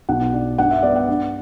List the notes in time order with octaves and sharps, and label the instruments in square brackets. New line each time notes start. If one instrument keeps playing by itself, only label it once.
[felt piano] B1 F#5
D4
G2 F#5
E5
B3 D5
F#5
G2